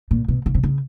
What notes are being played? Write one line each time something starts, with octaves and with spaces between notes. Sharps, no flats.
A#2
B2
C#3
C3
C#3